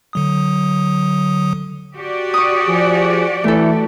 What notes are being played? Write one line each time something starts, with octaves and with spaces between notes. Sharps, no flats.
D3 F#3 D#6
F#4 G4 D5
C#6 D#6
F3 G#4
E3 A3 A4